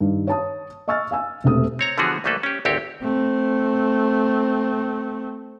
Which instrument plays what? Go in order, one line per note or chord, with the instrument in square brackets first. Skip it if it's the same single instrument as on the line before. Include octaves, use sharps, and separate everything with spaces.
[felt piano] G2 D#3
C#5 A5 D#6
D#5 G#5 C#6 E6 F6 A6
F5 G#5 E6
E1 C3 A3 D#6
[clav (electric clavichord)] C4 C#5 A#5
D3 E3 F3 B3 F#4 G#4
C2 E3 A3 A#3 A4 B4
C#4 G4
G#1 D2 C4 G4 C#5
[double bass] A3 C4